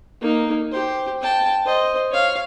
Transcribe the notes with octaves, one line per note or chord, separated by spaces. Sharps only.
A#3 D#4
G4 C5
G5 A5
C5 D#5
C#5 F5